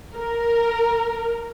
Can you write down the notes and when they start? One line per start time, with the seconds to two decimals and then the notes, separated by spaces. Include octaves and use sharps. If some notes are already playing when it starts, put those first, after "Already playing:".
0.16 A#4